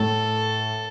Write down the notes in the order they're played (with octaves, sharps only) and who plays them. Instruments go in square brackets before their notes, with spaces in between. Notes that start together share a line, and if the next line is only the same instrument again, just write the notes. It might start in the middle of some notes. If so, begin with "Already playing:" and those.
Already playing: [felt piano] A2 A3 [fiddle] A4